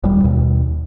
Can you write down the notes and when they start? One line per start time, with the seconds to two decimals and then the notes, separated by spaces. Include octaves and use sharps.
0.04 D#1 G3
0.24 D#2 B2